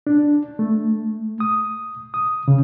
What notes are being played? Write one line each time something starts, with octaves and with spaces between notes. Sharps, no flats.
D4
A3
D#6
D#6
C#3